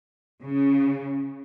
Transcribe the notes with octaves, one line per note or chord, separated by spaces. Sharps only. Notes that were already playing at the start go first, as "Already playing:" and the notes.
C#3